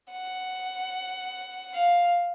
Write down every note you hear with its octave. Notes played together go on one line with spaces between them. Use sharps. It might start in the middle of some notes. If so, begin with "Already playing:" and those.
F#5
F5